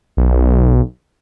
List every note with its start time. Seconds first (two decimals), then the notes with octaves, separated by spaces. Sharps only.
0.17 B1